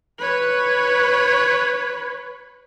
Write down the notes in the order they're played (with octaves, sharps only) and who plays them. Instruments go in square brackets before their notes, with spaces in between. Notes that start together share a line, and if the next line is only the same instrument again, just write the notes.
[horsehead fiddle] B4 C#5